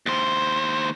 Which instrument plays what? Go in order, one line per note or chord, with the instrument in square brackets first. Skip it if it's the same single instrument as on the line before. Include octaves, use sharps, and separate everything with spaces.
[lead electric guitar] D#2 C5